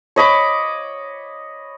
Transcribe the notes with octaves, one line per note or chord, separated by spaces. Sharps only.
C#5 D#5 B5 D6